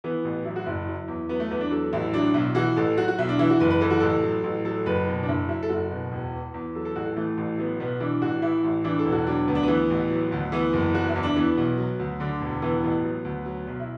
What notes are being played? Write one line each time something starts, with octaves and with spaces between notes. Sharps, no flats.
E3 B3
A1
F#3 E4
F#4
F#1 E4
F#3
E2
F#3 B3
A3
E2 B3
D4
F#3 A4
A1 E4
F#3 D4
B1 E4
E3 F#4
A1 A4
F#3 F#4
F#4
B1 E4
D4
E3 E4
F#4
F#1 B4
B4
E3 A4
F#4
A1 A4
F#3
A1
F#3 A4
F#1 B4
B2
D4
F#1 E4
F#3 E4
A4
F#1 F#4
B2
E1
E2
E2
F#3 A4
A4
A1 F#4
A4
E3 A3
A1
F#3 B3
B1 B3
E3 D4
A1 F#4
E3 E4
A1
E3 D4
A4
E1
F#4
F#3 D4
D2 B3
D4
B3
E3
A1
F#3
D2
E3 B3
F#1
F#3 F#4
E4
E2
D4
E3 B3
B1
F#3
D2
D3 D4
E1
E3 B3
A1 B3
F#3
D2
F#3
B1
E4